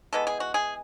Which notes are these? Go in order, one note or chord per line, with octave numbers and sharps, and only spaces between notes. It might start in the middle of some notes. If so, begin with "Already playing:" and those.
E3 G#3 B3 A4
G#4
F#4
G#4